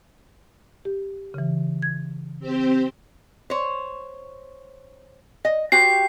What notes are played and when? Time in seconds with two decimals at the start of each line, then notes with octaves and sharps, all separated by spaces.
0.85 G4
1.34 C#3 E3
1.82 G#6
2.40 C4 G4 C5
3.50 C5 C#5
5.45 D#5
5.72 F#4 G4 C5 C7